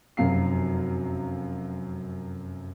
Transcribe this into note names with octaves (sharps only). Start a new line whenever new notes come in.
F1 F#2 F#3 F5 C7